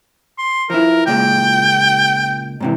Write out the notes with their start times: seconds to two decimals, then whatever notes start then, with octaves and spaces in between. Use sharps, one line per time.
0.38 C6
0.70 F3 E4 A#4
1.07 C#2 A#2 G#3 G5
2.60 G#2 C3 E3